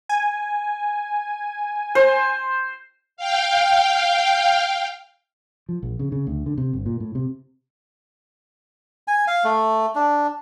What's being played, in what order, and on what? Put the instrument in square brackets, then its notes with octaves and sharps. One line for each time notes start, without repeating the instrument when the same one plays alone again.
[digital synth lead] G#5
[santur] C5
[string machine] F5 G5
[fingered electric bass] F3
A#1
C#3
C#3
D2
D3
C3
G1
A#2
A2
C3
[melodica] G#5
F5
A3
D4